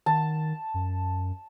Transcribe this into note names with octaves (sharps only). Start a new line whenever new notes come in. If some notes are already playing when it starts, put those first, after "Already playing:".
D#3 A5
F#2